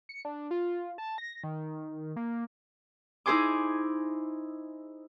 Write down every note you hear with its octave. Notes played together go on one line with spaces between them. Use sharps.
C#7
D4
F4
A5
A#6
D#3
A#3
D#4 E4 G#4 C5 G#5 D6